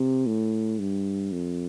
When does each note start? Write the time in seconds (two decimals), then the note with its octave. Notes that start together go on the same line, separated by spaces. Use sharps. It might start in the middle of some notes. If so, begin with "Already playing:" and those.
Already playing: C3
0.27 A2
0.79 G2
1.32 F2